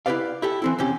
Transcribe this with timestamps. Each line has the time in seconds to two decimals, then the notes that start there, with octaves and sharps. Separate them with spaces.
0.06 E4 G4 G#4 B4 D5 F5
0.42 E4 G4 A4
0.62 E3 C4 E4
0.79 E2 C3 C#4 G4